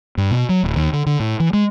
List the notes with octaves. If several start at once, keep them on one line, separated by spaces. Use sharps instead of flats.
G2
B2
F#3
D1
D#2
D3
D3
A2
E3
G#3